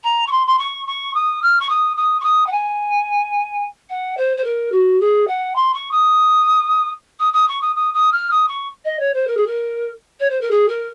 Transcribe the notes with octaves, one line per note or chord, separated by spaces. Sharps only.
A#5
C#6
C6
C6
C#6
C#6
D#6
F6
C#6
D#6
D#6
C#6
D#6
F#5
G#5
F#5
C5
C5
A#4
F#4
G#4
F#5
C6
C#6
D#6
D#6
D#6
C#6
D#6
D#6
D#6
F6
D#6
C#6
D#5
C#5
C5
A#4
G#4
A#4
C#5
C5
A#4
G#4
A#4